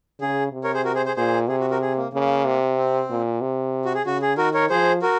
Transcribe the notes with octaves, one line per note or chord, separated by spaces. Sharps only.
C#3 G#4
C3
A#4 C#5
G#4 C5
F#4 A#4
G#4 C5
G#4 C5
A#2 G#4 C5
C3 G#4
F#4
F#4 A#4
G#4
A#3
C#3 A#3
C3
C4
A#2
C3
F#4
G#4
C#3 F#4
G#4
D#3 F#4 A#4
A#4 C#5
F3 G#4 C5
F#4 A#4